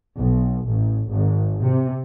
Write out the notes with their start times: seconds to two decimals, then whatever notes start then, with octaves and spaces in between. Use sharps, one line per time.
0.17 B1
0.69 A1
1.10 G#1
1.64 C3